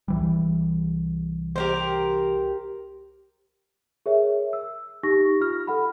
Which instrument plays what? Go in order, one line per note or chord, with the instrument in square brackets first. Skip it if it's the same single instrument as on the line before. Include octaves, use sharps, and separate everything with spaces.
[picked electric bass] C2 E3 G3
[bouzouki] G4 A#4 C5
[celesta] G#4 A#4 C#5 E5
E6
D#4 G4 C#6 A#6
F4 F6
A4 F#5 B5